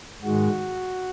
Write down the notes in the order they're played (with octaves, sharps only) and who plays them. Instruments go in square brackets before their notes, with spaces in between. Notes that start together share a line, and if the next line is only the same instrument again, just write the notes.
[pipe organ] G#2 D#3 G#3 F#4